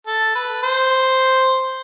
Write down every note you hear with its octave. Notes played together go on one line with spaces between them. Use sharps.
A4
B4
C5